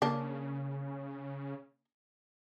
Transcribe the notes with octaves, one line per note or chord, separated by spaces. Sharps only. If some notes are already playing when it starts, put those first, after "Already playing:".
C#3 A#3 D4